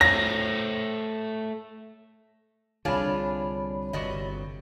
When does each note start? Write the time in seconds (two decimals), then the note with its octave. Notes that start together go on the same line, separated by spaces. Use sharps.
0.01 A3 C5 C#5 A#6
2.85 C2 D3 D4 F4 G#4 C#5 B5
3.93 G1 C3 F#4 D5 D#5